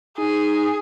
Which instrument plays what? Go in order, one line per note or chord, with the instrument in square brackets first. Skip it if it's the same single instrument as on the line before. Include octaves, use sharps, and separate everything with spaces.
[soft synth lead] D#4 [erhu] G#4